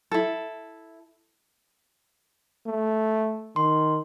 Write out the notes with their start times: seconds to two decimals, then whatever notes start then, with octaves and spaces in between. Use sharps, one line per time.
0.11 E4 A4
2.66 A3
3.56 D#3 C6